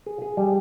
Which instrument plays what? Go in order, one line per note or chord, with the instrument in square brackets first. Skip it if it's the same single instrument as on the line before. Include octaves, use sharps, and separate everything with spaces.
[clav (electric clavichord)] G#4
G#4
G3